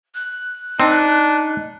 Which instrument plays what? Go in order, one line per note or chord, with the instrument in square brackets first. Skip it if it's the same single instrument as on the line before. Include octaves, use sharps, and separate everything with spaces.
[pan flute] F#6
[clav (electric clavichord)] C4 [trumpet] D4 [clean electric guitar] D#4